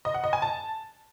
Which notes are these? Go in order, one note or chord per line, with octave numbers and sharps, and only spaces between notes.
D#5
F#5
D#5
G#5
A5